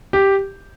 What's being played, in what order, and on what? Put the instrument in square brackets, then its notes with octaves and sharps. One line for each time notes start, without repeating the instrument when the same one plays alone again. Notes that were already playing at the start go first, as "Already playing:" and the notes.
[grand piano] G4